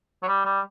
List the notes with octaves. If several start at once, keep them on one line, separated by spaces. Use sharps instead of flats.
F#3
G3
G3